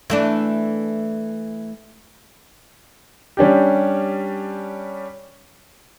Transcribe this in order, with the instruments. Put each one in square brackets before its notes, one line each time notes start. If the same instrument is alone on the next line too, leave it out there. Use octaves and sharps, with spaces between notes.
[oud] E3 A3 D4
[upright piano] G3 C#4 D4 G4